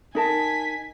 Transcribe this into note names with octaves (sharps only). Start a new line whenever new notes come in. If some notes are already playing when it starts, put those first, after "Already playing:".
D#4 A#4 G#5 A5 B6